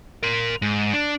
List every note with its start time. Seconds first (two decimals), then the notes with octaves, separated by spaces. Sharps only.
0.23 A#4 C6
0.62 G#2
0.93 D4